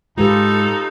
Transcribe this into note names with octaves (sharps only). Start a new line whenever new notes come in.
G#2 G#3 D#4 F4 G4 A4 B4